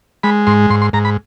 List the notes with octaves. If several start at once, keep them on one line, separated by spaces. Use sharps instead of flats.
G#3 B5
G#2 C6
G#2 C6
C6
G#2 A#5
B5